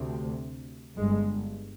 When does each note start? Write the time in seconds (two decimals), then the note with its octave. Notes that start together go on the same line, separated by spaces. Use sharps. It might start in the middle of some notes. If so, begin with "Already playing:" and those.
Already playing: D2 C3
0.97 G1 G2 G#3